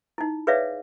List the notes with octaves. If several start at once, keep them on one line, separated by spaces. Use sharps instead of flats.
D#4 E4
G#4 B4 C#5 D5 E5 F5